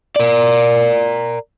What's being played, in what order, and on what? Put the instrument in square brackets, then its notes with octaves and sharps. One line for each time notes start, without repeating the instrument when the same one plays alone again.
[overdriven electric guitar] A#4 D5